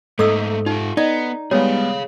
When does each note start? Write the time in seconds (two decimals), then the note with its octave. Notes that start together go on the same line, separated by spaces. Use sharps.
0.19 G#2 A3 A#3 A4 D#6 E6
0.66 D#4 F4 G4
0.97 B3 D#4 D5
1.51 G3 G#3 B3 G#4 C#5 F5